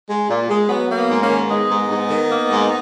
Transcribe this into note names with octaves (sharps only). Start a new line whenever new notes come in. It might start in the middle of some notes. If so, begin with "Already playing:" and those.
G#3
A#2
G#3
F#3 B3
A#3
B3
G#2
A#3 C#4
D#3
G#3 B3 D#4
G#2
G#2
D#3
A#3
G#2